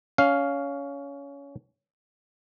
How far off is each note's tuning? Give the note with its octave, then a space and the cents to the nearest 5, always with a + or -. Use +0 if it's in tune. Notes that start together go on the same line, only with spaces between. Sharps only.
C#4 +20 F5 +0